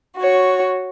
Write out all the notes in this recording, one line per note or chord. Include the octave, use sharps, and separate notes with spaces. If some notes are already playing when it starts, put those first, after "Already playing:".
F#4 C#5